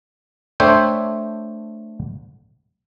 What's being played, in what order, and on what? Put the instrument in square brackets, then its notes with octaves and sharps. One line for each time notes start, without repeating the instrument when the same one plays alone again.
[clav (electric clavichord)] A3 D4 C5 C#5 E5 G5